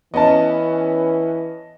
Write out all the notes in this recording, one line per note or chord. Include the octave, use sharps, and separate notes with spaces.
E3 B3 C#4 D#5 A5